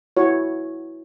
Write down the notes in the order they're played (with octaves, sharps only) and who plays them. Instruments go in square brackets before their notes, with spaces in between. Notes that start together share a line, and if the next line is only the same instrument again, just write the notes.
[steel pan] E4 F#4 C#5